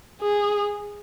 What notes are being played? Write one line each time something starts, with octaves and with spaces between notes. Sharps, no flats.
G#4